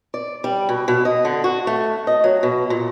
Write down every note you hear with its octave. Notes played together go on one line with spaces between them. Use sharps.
D5
G3
B2
B2
D#5
D3
F#4
A3
D#5
F#3
B2
A#2